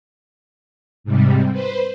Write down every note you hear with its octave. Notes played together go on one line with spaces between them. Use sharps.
G#2 C3 G3
B4 C5